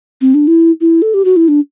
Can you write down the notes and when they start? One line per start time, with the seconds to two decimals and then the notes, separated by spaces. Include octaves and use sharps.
0.21 C4
0.34 D4
0.47 E4
0.81 E4
1.02 A4
1.14 G4
1.25 F#4
1.36 E4
1.48 D4